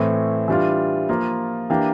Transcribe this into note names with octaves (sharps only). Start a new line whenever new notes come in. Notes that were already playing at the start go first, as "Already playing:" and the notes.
Already playing: A2 E3 A3 C4
E3 G3 D4 F4
F3 A#3 F4
E3 A#3 D4 G4